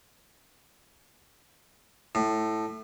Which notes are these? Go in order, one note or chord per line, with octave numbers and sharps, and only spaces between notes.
A2